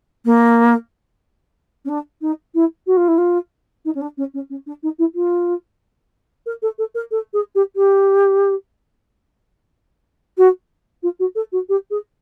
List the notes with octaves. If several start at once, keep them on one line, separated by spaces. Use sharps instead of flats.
A#3
C#4
D4
D#4
E4
F#4
F4
E4
F4
D#4
C#4
D4
C#4
C#4
C#4
D4
D#4
E4
F4
A#4
A4
A4
A#4
A4
G#4
G4
G4
F#4
F4
F#4
A4
F#4
G4
G#4